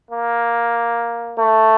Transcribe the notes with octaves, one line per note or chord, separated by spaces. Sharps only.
A#3
A3